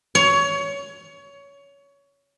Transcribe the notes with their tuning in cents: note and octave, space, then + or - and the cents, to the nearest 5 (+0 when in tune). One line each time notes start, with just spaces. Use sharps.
C#5 +20